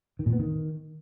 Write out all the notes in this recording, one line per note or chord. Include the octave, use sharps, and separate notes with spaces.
D#3
A#2
B3
D#3